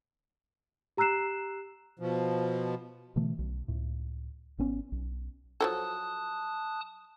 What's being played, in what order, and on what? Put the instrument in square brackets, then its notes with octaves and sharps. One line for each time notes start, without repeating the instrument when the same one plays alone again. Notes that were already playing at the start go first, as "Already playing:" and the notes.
[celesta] G4 A#5 E6 F#6 C7 E7
[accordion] B2 F3
[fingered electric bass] B2 D3 E3 A3
B1
C#2 A2
G#1 B3 C#4
B1
[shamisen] F3 F#3 A4 [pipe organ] A5 D#6 F#6